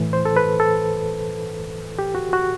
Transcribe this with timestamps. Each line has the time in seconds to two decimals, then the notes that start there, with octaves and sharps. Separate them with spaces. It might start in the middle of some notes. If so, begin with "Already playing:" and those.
Already playing: A2 E3
0.13 C5
0.25 A4
0.37 B4
0.60 A4
1.99 G4
2.15 F#4
2.33 F#4